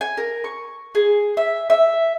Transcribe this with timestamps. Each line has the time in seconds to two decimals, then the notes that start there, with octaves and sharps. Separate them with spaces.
0.01 G#5
0.17 A#4
0.44 C#6
0.95 G#4
1.37 E5
1.70 E5